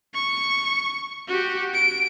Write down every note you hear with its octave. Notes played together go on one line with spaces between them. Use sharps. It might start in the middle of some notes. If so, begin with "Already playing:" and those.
C#6
F#4 G4
D7